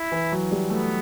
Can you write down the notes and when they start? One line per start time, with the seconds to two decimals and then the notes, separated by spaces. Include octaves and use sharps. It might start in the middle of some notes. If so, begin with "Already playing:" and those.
Already playing: E4
0.12 E3
0.32 F#3
0.52 G3
0.70 A3 B3